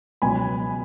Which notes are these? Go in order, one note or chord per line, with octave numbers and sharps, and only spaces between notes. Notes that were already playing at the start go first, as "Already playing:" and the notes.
C#2 B2 F#3 B3 G#5 B5